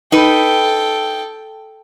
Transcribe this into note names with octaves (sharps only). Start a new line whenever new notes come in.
D#4 A4 B4 G5